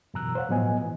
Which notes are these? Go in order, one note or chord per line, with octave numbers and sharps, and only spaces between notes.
F#2 B2 E3 A#5 E6 F#6
C5 C#5 F5 F#5
A2 F3 F#3 B3 D#5 G#5
A#2 E3